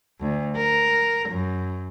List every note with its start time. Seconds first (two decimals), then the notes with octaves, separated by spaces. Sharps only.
0.20 D2
0.56 A#4
1.28 F#2